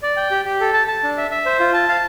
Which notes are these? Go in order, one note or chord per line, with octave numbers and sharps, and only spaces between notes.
D5
G5
G4
G4
A4
A5
A5
D4
E5
E5
C5
F4
A5
F5